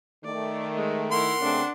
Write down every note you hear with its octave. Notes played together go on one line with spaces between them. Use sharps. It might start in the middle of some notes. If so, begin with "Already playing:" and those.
D#3 A3 D5
G#3
E4 A#4 F#5 C6
C#3 A3 C4 D4